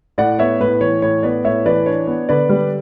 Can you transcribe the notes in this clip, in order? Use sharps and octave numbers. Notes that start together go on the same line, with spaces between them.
A2 D5 F#5
B3 C#5 E5
A2 B4
E3 C#5
A2 C#5
B3 B4 D5
A2 C#5 E5
E3 B4 D5
D4 C#5
B3
D3 B4 D5
G3